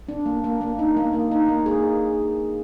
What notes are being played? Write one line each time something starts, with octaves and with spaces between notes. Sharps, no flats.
D4
A#3
A#3
A#3
D#4
A#3
A#3
D#4
A#3
G#4